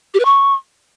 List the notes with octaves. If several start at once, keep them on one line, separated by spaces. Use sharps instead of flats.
G4
B4
C#6